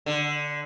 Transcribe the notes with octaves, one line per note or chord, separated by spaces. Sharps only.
D3